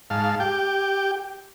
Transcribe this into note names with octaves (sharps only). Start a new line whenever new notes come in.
G#2 F5 A5
G4 G5